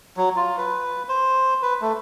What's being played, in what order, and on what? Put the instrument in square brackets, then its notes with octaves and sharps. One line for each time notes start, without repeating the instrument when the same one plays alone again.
[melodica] F#3
F4
B4
C5
B4
A3